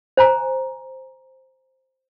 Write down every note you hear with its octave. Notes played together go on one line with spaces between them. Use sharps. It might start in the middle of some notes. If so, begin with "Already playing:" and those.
C5 G#5 A#5